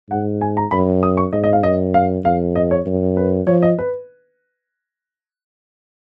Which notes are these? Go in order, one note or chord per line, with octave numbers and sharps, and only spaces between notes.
G#2 F#5
G#5
A#5
F#2 B5
D#6
C#6
G#2 D#5
D#5
F5
F#2 D#5
F5
F2 F5
D#5
C#5
F#2
B4
F3 C#5
D#5
B4